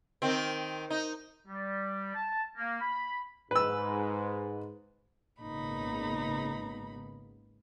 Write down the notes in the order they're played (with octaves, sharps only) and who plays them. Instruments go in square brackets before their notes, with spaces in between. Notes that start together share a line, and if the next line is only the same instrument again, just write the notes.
[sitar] D#3 C4
D#4
[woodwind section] G3
A5
A#3
B5
[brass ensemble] G#2 [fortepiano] B4 E6
[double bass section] G#1 C#3 B3 [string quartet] A#2 D#4 B5